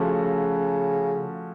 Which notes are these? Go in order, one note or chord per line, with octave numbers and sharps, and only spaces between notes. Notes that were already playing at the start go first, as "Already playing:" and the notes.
Already playing: C#3 F3 A3 C#4 F#4 A4